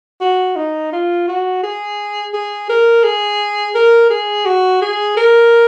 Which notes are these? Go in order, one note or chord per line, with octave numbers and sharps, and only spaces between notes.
F#4
D#4
F4
F#4
G#4
G#4
A#4
G#4
A#4
G#4
F#4
G#4
A#4